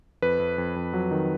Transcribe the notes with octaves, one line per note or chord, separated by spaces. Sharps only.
F2 B4
F2
F2
F2
F#3
D#3